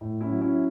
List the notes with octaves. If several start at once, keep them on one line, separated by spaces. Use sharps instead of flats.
A2
C#4 E4
F#3
C#4 E4